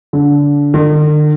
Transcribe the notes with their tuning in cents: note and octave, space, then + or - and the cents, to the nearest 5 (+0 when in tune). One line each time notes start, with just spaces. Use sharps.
D3 -25
D3 +45